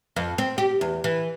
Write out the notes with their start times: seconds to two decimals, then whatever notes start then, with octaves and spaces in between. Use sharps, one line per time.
0.16 F2
0.38 C4
0.58 G4
0.81 E2
1.04 E3